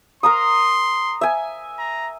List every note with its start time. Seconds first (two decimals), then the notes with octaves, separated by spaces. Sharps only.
0.23 A#4 A#5 C6 D#6
1.21 E5 G#5
1.79 A#5